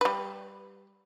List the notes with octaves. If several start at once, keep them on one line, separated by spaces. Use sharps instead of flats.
G3 B4